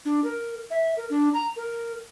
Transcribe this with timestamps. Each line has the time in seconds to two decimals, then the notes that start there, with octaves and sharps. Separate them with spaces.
0.05 D4
0.24 A#4
0.70 E5
0.97 A#4
1.10 D4
1.34 A#5
1.56 A#4